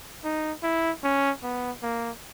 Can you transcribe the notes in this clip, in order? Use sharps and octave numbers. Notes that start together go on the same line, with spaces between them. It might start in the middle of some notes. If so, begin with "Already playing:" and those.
D#4
E4
C#4
B3
A#3